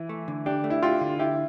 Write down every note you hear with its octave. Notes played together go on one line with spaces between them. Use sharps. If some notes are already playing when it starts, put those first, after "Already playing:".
Already playing: E3
A3
D3
D4 G4
A3
E4
F4 G4
D3
E4 G4